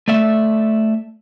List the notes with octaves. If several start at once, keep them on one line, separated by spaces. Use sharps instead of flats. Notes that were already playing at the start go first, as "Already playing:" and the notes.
A3 D5 E5